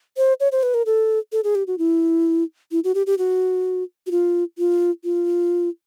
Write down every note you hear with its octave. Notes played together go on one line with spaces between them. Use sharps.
C5
C#5
C5
B4
A#4
A4
A4
G#4
G4
F#4
E4
E4
F#4
G4
G4
F#4
F#4
F4
F4
F4